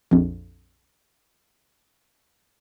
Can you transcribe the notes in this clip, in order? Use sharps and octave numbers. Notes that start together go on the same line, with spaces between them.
A#1 F2